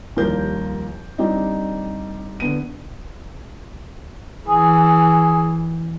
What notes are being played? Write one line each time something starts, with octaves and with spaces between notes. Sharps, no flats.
D#2 F3 G3 A#4 G6
G3 C4 D4 D#4
D3 B3 D#7
E3 G#4